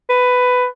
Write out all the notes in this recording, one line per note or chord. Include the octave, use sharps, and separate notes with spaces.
B4